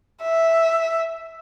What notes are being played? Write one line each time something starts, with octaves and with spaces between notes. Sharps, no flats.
E5